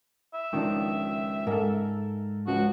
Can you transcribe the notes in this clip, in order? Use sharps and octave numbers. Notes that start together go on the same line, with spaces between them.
E5
C#2 D#3 F3 D4
G#2 A4 A#4
C#2 F3 F#4